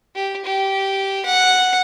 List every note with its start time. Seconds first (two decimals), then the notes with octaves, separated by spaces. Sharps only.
0.15 G4
0.45 G4
1.26 F#5